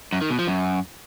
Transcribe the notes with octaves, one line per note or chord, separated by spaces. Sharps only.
F#2
D#3
B2
F3
F#2